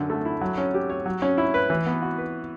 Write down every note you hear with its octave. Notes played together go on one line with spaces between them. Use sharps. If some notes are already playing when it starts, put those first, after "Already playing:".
Already playing: F#2 D3
A3
E4
F#3
C#4
G4
C#5
F#3
C#4
E4
B4
E3
B3
F#4
B4